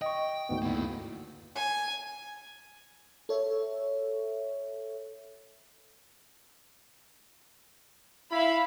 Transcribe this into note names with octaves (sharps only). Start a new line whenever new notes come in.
D#5 G5 C#6
D2 G#2 B3
A#3 E4
G#5
A4 C#5 E5
E4 E5 F5 B5